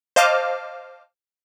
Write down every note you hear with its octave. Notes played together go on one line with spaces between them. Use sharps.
C5 D#5 F5 A5 D6 F6